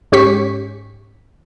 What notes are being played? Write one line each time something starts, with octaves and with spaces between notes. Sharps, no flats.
G#2 C#4 G4 C#6 B6